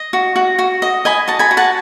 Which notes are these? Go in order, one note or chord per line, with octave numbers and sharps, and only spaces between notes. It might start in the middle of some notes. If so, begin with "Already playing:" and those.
Already playing: D#5
F#4
F#4
F#4
D#5
D#5 G#5 B5
F#4 A5
G#5 B5
F#4
F#5 A5